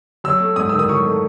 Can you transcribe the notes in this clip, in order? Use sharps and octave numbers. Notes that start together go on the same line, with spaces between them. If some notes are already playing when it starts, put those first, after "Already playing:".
F#3 E6
A3
G#2 D#6
D#3 E6
D#6
F#3 C#6
A3